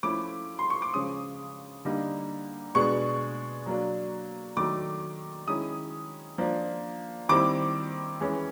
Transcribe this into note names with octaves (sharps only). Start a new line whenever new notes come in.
F3 A3 C#4 E4 D6
C6
C#6
D6
C#3 F3 G#3 C#4 D#6
D3 G3 A#3 D#4
B2 G#3 B3 D4 C#6
F#3 A#3 D4
D#3 F#3 A3 D4 D6
D#3 G#3 C#4 E4 D#6
F3 A#3 D4
D#3 G3 C4 E4 D6
E3 G#3 C#4 E4